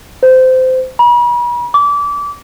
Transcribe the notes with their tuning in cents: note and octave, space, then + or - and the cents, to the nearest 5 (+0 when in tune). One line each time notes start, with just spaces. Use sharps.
C5 -20
B5 -45
D6 -25